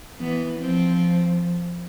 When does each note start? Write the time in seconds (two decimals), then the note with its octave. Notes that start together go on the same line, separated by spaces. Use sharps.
0.20 E3 B3
0.60 F3 C4